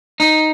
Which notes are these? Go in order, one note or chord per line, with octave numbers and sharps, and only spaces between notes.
D#4